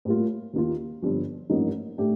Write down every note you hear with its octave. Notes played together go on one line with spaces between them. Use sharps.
A2 G3 A#3 F4
D#2 D#3 A#3 F4
G1 G2 F3
A1 G2 F3 A#3 D#4
A2 A3 D4 G4